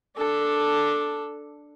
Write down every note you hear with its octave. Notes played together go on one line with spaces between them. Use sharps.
D4 A4